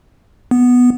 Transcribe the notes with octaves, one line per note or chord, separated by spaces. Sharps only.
B3